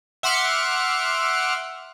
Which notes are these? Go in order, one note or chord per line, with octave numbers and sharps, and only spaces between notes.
E5 F#5 C6 D6 F6 C#7